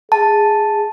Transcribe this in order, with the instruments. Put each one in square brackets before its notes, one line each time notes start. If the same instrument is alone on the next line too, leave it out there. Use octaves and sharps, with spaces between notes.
[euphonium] G#4 [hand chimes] A5